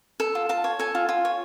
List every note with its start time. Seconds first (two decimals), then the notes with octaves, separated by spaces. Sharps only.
0.20 A4
0.35 F4
0.49 F4 A5
0.64 C#5
0.79 A4 G#5
0.95 F4
1.09 F4
1.25 C#5